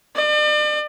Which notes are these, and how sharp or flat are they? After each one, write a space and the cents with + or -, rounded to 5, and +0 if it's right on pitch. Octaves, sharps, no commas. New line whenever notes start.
D5 +40